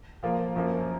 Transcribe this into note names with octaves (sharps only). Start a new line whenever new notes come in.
F3 A#3 F4
F#2 F3 A#3